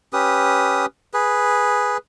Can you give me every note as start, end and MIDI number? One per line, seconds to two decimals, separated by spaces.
0.13 0.86 61
0.13 0.86 67
0.13 0.86 71
0.13 0.86 87
1.14 1.97 68
1.14 1.97 71